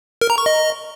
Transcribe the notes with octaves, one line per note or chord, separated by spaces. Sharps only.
A#4
A#5
C#6
D#5